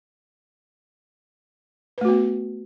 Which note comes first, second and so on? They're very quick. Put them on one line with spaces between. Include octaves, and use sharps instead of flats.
B4 A3 F#4 B3